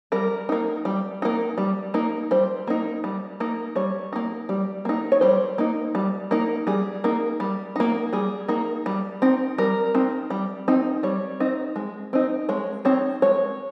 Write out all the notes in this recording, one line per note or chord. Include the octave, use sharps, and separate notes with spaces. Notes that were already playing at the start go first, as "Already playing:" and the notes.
G3 A#4
A#3 D#4
G3
A#3 D#4
G3
A#3 D#4
G3 C5
A#3 D#4
G3
A#3 D#4
G3 C#5
A#3 D#4
G3
A#3 D#4
C#5
G3 C5
A#3 D#4
G3
A#3 D#4
G3 G#4
A#3 D#4
G3
A#3 D#4
G3 G#4
A#3 D#4
G3
C4 D#4
G3 A#4
C4 D#4
G3
C4 D#4
G3 C#5
C4 D#4
G#3
C4 D#4
G#3 C#5
C4 D#4 C#5
G#3 C#5